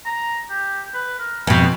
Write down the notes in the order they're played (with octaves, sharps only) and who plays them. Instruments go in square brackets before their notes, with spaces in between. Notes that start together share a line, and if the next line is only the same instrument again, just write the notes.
[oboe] A#5
G4
B4
A#4
[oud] F2 B2 [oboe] G5